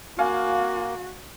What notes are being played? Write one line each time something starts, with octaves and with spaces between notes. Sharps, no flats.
A#3 F#4 F5 G#5